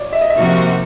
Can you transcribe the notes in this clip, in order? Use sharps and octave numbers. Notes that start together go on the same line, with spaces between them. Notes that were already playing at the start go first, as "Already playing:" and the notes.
Already playing: C#5 D5
E5
D#5
E5
C3 F3 A#3 D#4 F#4